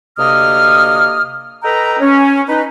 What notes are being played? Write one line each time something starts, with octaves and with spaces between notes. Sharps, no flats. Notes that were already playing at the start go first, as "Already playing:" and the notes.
D2 C3 A#3 D#5 D#6 F6
A4 B4 D#5 G5 A#5
C#4
D#4 B4